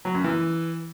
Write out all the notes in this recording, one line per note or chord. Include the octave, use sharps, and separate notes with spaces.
F#3
F#2
E3